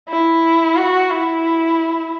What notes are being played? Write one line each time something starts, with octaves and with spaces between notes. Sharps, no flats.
E4
F#4
E4